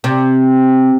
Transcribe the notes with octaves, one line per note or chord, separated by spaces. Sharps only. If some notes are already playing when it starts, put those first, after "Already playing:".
C3